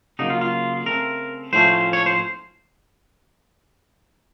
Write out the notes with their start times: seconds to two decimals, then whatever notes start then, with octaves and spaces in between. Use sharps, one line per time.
0.19 C#3 F#3 A#3 D#4
0.30 F4
0.41 F4
0.86 C#3 A3 C4 A#4
1.53 A2 F3 A3 C#4 C5
1.93 C#5
2.06 C5